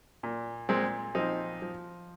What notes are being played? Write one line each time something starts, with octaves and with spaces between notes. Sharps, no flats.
A#2
A#2 G#3 C4
F3 C4 D#4
F3